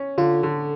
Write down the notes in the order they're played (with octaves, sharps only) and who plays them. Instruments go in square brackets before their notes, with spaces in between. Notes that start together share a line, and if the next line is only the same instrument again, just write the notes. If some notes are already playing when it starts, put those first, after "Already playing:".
Already playing: [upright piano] C#4
[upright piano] D3 [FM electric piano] F4
[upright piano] D3